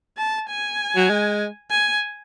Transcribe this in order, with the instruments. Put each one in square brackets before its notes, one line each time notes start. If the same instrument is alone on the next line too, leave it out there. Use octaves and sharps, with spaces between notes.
[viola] A5
G#5
[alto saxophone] F#3
G#3
[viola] G#5